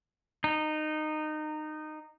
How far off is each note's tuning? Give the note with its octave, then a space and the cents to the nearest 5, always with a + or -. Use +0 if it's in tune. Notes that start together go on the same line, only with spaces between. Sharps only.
D#4 -20